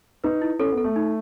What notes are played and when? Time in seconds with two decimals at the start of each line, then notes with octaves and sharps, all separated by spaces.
0.24 D#4 B4
0.42 E4
0.59 C#4 A4
0.72 B3
0.77 A4
0.84 A3
0.96 D#4